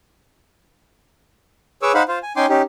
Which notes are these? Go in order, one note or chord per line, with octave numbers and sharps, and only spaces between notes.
G#4 B4 C#5 C#6 D6 E6
D#4 C5 F5 F#5 B5
F4 C5 F5
G#5
C#4 D#4 G5 G#5 C6 D6
C#4 D#4 G4